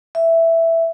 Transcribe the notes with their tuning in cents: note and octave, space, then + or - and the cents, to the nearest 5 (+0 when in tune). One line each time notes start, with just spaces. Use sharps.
E5 +5